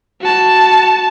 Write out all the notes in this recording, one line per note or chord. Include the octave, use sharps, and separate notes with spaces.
F#4 A5